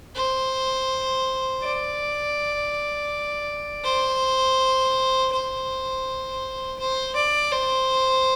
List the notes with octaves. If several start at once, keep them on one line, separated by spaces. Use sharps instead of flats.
C5
D5
C5
C5
C5
D5
C5